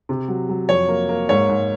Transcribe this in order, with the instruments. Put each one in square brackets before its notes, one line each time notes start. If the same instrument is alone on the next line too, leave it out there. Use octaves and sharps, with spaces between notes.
[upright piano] C3
F#3
F#3
F2 C#5
A#3
A#3
G#2 C#5
G#2